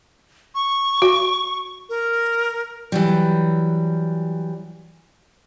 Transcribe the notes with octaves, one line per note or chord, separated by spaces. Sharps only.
C#6
F#4
A#4
E3 F#3 G3